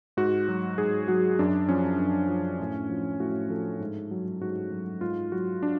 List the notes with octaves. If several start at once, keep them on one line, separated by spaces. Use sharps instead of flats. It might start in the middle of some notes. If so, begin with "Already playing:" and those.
G#2 F#4
F#3
G#2 G#4
F#3 F#4
F#2 D4
F3 C#4
F#2
F3
A2
F3
A2 F#4
F3 A4
G#2
F#3
G#2 F#4
F#3
G#2 F4
F#3 F#4
D4